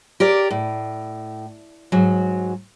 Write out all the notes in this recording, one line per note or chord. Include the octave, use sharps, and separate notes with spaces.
G4 A#4 D5
A2
G#2 F#3